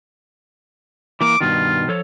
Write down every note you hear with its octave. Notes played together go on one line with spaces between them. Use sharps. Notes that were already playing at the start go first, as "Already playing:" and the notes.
E3 A#3 D6
G2 B2 D#3 F4
F3 A4 C#5